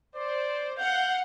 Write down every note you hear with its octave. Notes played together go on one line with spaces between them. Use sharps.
C5 D5
F5 F#5 G6